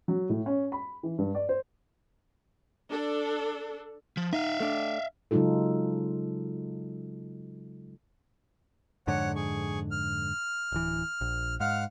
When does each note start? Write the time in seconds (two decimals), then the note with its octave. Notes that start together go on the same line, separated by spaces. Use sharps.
0.08 F#3
0.29 A2
0.46 C#4
0.72 B5
1.03 E3
1.18 G2
1.35 D5
1.49 C5
2.91 D4 A4
4.17 F3
4.33 D#4 E5 F5
4.60 A3 D4
5.31 C#3 F#3 G#3 D#4 F4 A4
9.07 F2 G#2 D3 C#5 F#5
9.36 G#4 C#6
9.91 F6
10.72 D1 E3
11.21 A#1
11.60 G#2 F5 F#5 F6